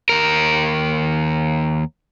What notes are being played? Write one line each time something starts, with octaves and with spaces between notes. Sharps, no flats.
D#2 A#4